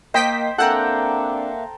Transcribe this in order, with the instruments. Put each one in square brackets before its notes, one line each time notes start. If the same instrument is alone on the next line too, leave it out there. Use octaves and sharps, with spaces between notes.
[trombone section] A#3 [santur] C5 [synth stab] D#5 G5 B6
[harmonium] A#3 E5 [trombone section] C4 D4 [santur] A4 G5 A#5 [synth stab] F#5